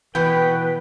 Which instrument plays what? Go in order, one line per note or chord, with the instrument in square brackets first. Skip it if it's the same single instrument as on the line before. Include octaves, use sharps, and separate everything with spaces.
[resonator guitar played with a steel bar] B2 B3 [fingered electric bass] E3 [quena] B4 [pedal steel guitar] G5